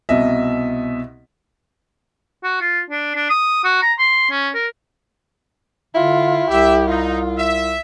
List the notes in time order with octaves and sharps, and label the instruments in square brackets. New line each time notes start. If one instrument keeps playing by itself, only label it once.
[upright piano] C2 B2 D#5 E5
[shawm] F#4
F4
D4
D4
D#6
F#4
A#5
C6
C#4
A#4
[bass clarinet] D3 [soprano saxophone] E4 [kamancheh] F4
[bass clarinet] C2 [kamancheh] G4 [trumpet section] E5
[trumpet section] D#4 [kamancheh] F4
[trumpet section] E5